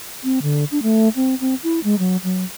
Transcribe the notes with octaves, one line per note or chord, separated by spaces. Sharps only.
C4
D3
D4
A3
C4
C4
E4
G#3
F#3
F#3